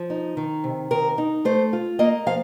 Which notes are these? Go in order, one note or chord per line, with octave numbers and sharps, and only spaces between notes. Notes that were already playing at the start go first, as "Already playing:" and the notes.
Already playing: F3
D#4
D#3
C3
D#3 A#4
D#4
A3 C5
F4
A#3 D#5
F3 F5